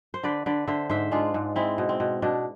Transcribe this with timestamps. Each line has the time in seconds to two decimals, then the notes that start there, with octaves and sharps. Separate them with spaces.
0.14 C5
0.23 D3 B4 D5
0.46 D3 B4 D5
0.67 D3 C5 E5
0.89 G#2 C5 E5
1.12 G#3 D4 F4
1.34 G#2
1.56 G#3 C4 E4
1.78 B2
1.89 C4
2.00 B2
2.22 B2 D4